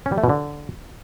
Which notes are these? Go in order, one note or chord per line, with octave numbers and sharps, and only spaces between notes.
C#4
G3
A3
B2
D3